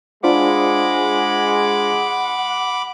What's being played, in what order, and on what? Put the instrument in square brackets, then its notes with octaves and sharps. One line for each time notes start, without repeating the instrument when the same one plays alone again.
[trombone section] G#3 [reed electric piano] D4 F4 C5 [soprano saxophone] F#5 [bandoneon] B5 D6